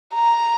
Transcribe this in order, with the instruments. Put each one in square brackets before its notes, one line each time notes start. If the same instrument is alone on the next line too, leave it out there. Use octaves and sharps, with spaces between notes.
[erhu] A#5